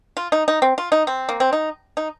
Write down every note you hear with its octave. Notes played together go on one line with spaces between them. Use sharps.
F4
D#4
D#4
C4
F4
D#4
C4
A#3
C4
D#4
D#4